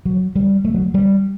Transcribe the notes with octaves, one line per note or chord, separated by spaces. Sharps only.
F#3
G3
A3
F#3
G3